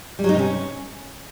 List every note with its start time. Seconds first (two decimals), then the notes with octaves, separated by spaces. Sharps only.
0.19 G3
0.24 F#3
0.29 D#4
0.34 C3
0.39 C#4